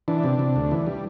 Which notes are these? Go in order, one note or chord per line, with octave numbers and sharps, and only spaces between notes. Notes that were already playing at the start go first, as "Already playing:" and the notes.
E3 D4
C3
C3
D2
E3
G3